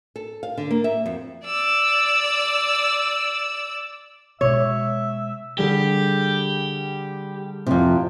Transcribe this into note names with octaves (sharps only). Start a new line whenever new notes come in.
A4
F5
D3
A#3
E5
F2
D5 E6
B2 G#3 C#5 E5
D3 G3 G4 G#4
F2 C3